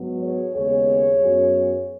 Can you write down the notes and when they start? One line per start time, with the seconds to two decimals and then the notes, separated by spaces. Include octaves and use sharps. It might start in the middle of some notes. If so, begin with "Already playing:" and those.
Already playing: G#2 F#3 B3
0.22 G#4 C#5
0.55 D#2 C#3 G#3 B3 G#4 C#5
1.22 F#2 F#3 B3